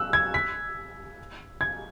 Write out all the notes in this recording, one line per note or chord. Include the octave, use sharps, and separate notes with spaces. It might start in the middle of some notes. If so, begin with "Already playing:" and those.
Already playing: E6 F#6
G#6
B6
G#6